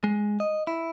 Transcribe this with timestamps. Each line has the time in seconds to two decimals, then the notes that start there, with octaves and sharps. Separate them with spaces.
0.04 G#3
0.40 D#5
0.67 E4